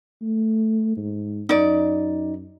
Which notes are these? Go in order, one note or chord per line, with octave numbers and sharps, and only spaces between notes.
A3
G#2
F#2 D#4 D5